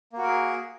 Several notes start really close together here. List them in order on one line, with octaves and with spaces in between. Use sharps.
A#3 F#4 A#4 G#4